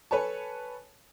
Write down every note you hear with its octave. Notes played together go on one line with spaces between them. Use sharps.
A4 B4 C#5 G#5 A5